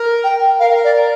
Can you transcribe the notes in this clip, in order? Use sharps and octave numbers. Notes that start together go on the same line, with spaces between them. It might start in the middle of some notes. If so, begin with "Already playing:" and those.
Already playing: A#4
G5
A#4 F5
D5